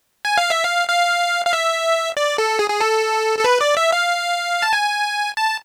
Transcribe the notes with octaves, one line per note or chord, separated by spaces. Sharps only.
G#5
F5
E5
F5
F5
F5
E5
D5
A4
G#4
G#4
A4
A4
B4
D5
E5
F5
A5
G#5
A5